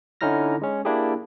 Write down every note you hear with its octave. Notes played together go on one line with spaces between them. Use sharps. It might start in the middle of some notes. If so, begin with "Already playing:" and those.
D3 C#4 D#4 E4 F6 A#6
G#3 C#4
A#3 D4 E4 G4 G#4